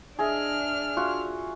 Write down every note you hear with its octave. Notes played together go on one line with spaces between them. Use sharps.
D4 G#4 D#5 E5 F6
F4 F#4 E5